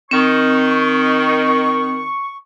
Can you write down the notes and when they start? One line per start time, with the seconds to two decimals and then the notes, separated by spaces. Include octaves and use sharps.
0.11 D#3 C4 C#6